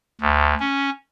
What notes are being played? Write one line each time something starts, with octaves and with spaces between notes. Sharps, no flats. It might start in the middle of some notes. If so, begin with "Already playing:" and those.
D2
C#4